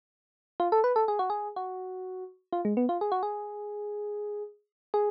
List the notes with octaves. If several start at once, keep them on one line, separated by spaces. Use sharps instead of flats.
F4
A4
B4
A4
G#4
F#4
G#4
F#4
F4
G#3
B3
F4
G#4
F#4
G#4
G#4